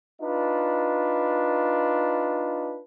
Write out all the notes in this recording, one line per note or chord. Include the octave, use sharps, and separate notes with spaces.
D4 D#4 F4 B4